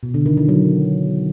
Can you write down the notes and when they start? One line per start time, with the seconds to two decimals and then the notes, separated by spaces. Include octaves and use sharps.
0.03 B2
0.14 D3
0.26 D#3
0.37 E3
0.49 F#3